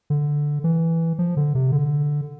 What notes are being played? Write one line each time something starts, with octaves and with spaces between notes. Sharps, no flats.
D3
E3
F3
D3
C3
D3